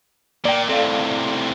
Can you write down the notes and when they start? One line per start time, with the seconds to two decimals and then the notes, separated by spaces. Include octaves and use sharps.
0.45 A#2 D5 G5
0.69 A2 C3 A4 D5 F5